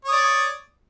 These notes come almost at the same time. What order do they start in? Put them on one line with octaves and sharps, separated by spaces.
C#5 D#6 D5